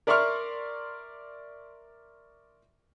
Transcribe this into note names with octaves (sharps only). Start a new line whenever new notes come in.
A#4 D5 E5 C6 C#6 F6